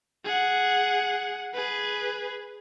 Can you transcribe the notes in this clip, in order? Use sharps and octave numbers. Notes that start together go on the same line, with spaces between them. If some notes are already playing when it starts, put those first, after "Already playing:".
G#4 F#5
G#4 B4